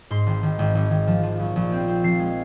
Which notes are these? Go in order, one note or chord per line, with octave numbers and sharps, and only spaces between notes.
G#2 C6
G#1
G#1
G#1
G#1
G#1
F3
F3
A#1
A#1
C4
C4
F3 C7
G#3